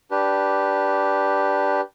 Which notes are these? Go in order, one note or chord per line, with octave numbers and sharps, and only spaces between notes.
D4 G4 B4